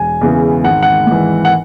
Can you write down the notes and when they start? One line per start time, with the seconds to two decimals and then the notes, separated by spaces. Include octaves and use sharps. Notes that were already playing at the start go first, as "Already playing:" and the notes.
Already playing: E1 G#5
0.21 E2 C#3 E3
0.64 G#1 F#5
0.83 F#5
1.07 G#2 E3
1.45 F#5